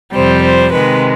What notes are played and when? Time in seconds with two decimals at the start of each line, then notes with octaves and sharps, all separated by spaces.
0.14 F2 C3 G3 C5
0.43 C5
0.73 C3 D#3 G#3 B4